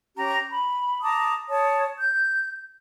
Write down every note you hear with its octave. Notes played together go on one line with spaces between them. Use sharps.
C#4 G4 A#5
B5
A5 A#5 D6 D#6
C#5 A5 D#6
G6